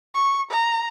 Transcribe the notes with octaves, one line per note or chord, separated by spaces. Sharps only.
C#6
A#5